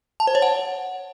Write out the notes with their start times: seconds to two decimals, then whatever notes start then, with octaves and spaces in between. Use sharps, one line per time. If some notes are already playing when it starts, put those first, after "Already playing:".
0.20 A5
0.27 C5
0.35 C#5
0.42 F#5